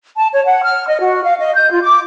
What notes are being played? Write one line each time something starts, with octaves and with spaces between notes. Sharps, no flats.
A5
C#5
F#5
F6
D#5
F#4
F5
D#5
G6
F4
D6